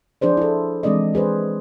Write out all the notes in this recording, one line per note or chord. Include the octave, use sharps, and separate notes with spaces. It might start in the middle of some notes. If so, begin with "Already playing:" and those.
F3 D4 G#4 C5 D5
E4 A4
E3 G#3 C4 D4 D5 D#5
D4 G#4 B4 C5